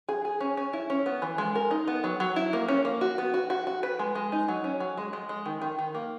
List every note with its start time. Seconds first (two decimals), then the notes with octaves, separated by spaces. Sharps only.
0.09 G#4
0.25 G#4
0.40 C#4
0.57 C#4
0.73 E4
0.90 C#4
1.06 B3
1.22 E3
1.38 G#3
1.55 A#4
1.71 D#4
1.87 B3
2.04 F#3
2.20 F#3
2.36 E4
2.53 A#3
2.68 C#4
2.85 A#3
3.01 F#4
3.18 B3
3.34 F#4
3.50 F#4
3.67 F#4
3.83 B4
3.99 G#3
4.15 G#3
4.32 D#4
4.48 F#3
4.64 C#4
4.80 F#3
4.97 G#3
5.13 G#3
5.29 G#3
5.46 D#3
5.62 D#3
5.79 D#3
5.95 A#3